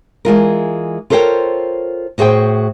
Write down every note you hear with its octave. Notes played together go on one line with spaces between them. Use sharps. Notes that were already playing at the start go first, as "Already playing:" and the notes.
E3 G#3 F4 A#4
F4 A4 A#4 C5 C#5 G5
A2 F#4 G#4 C5 G5